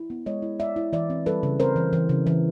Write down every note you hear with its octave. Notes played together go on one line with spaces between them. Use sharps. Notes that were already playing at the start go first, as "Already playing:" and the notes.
Already playing: E4
B3
G#3 C#5 D#5
E4
G#3 D5 E5
E4
E3 D5 E5
C4
G3 A4 B4
C#3
C4 A#4 C5
E3
E3
C#3
E3